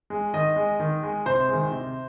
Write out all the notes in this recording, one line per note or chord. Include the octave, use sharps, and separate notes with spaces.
G#3
D#3 D#5
G#3
D#3
G#3
C3 C5
D#3 G#3
C3